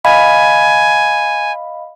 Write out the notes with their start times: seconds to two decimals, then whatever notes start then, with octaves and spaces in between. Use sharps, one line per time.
0.05 D#5 F5 G#5 B5